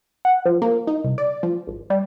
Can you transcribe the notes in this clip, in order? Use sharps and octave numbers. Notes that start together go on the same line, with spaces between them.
F#5
F3
A#3
D#4
C2
D5
F3
G#1
G3